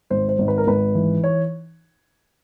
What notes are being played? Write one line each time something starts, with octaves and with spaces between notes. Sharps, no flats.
G#1 C5
C5
G#1
B4
A#4
G#1 B4
E3
C#5